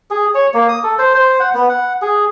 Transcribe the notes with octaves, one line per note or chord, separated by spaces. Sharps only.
G#4
C#5
A#3
D#6
A4
C5
C5
F#5
B3
F#5
G#4